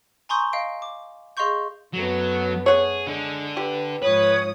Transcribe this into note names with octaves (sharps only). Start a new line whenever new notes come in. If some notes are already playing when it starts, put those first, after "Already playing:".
G#5 A#5 C6 C#6 D#6 G6
D#5 F5 D7
D6
G#4 D#5 F5 C6 C#6 G6
F#2 F#3 A3 B3
G#4 C#5 F#5
D3 G#3
G4 B4
G#2 F3 B4 C#5 D#6